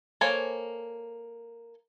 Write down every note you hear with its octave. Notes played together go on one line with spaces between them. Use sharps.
A#3 A4 C5 C#5 G#5